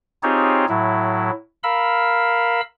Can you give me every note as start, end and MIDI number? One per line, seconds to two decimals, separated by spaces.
0.23 0.65 60
0.23 0.65 63
0.23 0.65 65
0.23 0.65 67
0.23 0.65 68
0.23 0.65 73
0.69 1.31 45
0.69 1.31 54
0.69 1.31 64
1.64 2.61 70
1.64 2.61 77
1.64 2.61 83
1.64 2.61 88